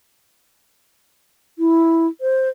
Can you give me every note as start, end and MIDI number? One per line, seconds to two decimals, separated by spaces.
1.59 2.07 64
2.21 2.49 72